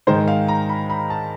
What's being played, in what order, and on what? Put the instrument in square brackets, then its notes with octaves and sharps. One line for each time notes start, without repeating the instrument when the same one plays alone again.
[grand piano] G#2 D#3 G#3 C5
F5
A#5
B5
B5
A5